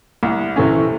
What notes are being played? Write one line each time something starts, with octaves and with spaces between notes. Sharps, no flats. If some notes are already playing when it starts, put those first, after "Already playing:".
C2
C3 E3 A3 C#4